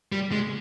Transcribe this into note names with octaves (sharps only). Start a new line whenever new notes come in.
G3
G#3